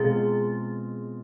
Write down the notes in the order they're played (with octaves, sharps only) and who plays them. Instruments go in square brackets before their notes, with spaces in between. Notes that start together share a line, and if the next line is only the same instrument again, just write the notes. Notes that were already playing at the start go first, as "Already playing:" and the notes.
Already playing: [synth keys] B2 G#3 C4 F4 [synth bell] G#4